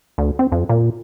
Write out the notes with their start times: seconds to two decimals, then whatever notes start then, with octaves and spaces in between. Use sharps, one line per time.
0.18 D2
0.39 C4
0.52 F2
0.69 A#2